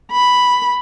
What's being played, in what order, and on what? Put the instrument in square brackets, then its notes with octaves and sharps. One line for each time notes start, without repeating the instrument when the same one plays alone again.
[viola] B5